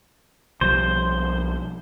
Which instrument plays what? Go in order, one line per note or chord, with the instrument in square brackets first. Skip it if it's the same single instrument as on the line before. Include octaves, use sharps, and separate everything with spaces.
[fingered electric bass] B1 F3 G3 [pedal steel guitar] C5